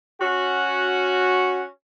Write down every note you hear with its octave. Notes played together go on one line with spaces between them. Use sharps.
C#4 F#4